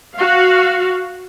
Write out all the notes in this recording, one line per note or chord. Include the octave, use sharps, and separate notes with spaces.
F#4 F5